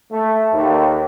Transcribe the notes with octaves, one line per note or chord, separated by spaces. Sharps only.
A3
D#2